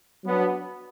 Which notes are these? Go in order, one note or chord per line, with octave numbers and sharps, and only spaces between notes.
F#3 B3 D4